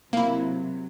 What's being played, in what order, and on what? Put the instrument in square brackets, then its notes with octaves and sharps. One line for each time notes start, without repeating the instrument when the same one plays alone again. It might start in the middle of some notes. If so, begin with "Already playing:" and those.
[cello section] C3 F#3 [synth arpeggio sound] A#3 E4